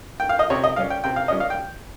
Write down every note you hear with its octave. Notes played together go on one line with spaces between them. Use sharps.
G5
F5
D#5
C3 C#5
D#5
G3 C#4 F5
G5
C3 G5
F5
G3 C#4 D#5
F5
G5